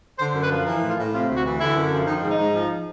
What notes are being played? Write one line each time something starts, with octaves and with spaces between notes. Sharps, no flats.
D3 C5
F#2
B4
F3
E3 A#4
A2
F4
A2
C3 F4
D2
F#4
E3
D3 E4
F#2
F3
D#3 D#4
G#2
D#4
G#2
F3